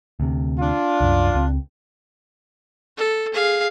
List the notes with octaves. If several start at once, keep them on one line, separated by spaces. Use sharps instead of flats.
D2 C3
D4 F4
C2 F#2
C#2 C4
A4
G#4 F5